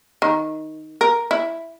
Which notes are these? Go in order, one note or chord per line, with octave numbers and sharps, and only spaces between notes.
D#3
A#4
E4